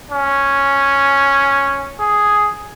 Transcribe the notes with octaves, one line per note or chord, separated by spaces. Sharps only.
C#4
G#4